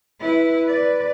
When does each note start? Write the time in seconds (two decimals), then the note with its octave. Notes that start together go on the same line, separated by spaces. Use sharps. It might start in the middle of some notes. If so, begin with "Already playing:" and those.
0.20 E4 B4
0.66 B4 D5